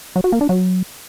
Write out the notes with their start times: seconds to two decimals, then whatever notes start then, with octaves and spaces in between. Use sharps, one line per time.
0.16 F#3
0.24 F#4
0.32 A#3
0.41 D4
0.49 F#3